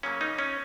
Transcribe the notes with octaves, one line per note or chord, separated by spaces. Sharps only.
C#3 F#3 A#3 C#4
D#4
C#4